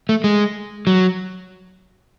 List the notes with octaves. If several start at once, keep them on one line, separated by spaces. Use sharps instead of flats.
A3
G#3
F#3